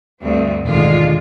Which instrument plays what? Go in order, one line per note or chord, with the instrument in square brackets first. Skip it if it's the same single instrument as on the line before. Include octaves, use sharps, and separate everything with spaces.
[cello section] D2 G2 C4
[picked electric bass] E1 G#2 D#3 [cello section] D3 G#3 F4